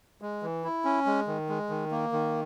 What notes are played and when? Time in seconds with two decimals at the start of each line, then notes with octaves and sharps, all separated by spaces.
0.22 G#3
0.43 E3
0.64 E4
0.85 C#4
1.06 G#3
1.27 D#3
1.49 G#3
1.70 D#3
1.91 A#3
2.12 D#3